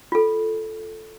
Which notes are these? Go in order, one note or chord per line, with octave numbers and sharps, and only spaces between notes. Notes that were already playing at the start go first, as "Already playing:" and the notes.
F4 A4